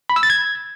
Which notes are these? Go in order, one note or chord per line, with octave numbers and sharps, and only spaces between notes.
B5
E6
A6
G#6